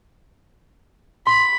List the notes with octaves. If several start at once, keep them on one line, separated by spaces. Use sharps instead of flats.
B5 C6